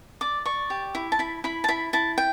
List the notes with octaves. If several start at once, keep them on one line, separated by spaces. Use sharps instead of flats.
D5 D6
D5 C#6
G4
E4
A5
E4 B5
E4 B5
A5
E4 B5
E4 A5
G5